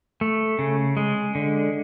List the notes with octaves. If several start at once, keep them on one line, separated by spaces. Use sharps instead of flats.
A3
C#3
G#3
D3